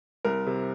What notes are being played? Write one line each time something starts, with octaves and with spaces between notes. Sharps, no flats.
C2 A#4
C3